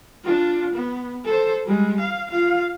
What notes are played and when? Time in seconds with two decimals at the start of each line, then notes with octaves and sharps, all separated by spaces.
0.24 D4 F4
0.74 B3
1.24 A4 C5
1.66 G3 G#3
1.99 F5
2.30 F4 F5